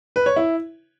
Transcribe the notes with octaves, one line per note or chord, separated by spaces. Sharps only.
B4
C#5
E4